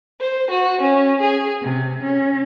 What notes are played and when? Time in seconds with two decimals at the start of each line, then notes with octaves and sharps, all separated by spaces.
0.20 C5
0.51 F#4
0.81 C#4
1.22 G#4
1.62 C3
2.03 C#4